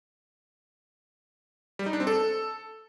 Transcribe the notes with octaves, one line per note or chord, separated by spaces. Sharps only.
G3
D#4
D4
C4
A4